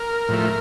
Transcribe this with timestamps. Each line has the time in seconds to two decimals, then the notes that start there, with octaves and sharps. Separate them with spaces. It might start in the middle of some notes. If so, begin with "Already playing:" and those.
Already playing: A#4
0.29 A2 F3 A3